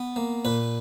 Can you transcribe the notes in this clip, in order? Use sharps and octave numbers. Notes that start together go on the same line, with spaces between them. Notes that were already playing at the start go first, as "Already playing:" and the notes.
Already playing: B3
A#3
A#2 B4